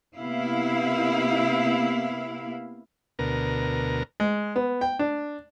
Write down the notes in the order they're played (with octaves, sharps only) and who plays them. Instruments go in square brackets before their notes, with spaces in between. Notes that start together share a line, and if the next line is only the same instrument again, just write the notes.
[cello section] C3 A#3 B3 E4 F5
[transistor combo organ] D2 B2 A#4
[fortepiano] G#3
B3
G5
D4